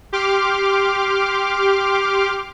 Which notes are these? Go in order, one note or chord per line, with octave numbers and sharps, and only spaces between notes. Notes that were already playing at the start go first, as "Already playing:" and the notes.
G4 C6 D6 F6